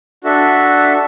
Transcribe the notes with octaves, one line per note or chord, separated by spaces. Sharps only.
D4 F#4 A4 E5